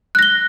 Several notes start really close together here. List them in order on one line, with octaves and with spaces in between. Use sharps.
F#6 A#6 G7